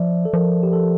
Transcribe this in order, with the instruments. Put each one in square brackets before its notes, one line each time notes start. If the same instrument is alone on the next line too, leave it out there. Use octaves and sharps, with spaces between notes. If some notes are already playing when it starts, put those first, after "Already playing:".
Already playing: [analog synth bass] F3 [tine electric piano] D5 E5
[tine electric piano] A4
[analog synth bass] F3 [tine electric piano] A#4
[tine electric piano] G4
A4